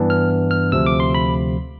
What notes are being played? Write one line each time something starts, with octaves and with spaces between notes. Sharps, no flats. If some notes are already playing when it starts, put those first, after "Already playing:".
Already playing: G2 E3 B3 D4
F6
F6
D2 C3 F3 E6
D6
C6
B5